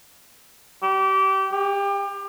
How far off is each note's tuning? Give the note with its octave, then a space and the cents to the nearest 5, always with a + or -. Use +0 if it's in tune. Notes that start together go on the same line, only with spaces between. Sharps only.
G4 -25
G4 +30